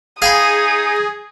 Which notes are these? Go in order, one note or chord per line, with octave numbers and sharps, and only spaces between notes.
D#4 G#4 F5 G5 B5 D#6